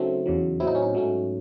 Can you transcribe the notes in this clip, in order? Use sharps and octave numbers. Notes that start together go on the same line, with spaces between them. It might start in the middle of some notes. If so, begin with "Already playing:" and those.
Already playing: C#3 F#3 A3 C4 D#4
E2 C#3 F#3
A2 F#3 C4 E4
D#4
C#4
D#4
G#2 F#3 A3 C#4